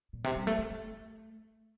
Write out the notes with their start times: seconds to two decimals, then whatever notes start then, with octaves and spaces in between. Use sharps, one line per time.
0.13 A#2
0.24 C3
0.36 G3
0.47 A3
0.58 A3
0.71 A3